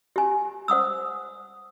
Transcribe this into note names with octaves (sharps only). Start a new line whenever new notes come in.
G4 G#5
C5 F#5 D#6 E6